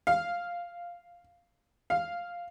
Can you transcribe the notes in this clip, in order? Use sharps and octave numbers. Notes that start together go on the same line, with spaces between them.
F5
F5